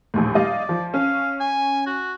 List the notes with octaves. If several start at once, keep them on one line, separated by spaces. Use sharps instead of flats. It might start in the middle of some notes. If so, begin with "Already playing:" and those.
A#1 D#2 A2
G3 D5 D#5 F5
F3
C#4 F5
G#5
F#4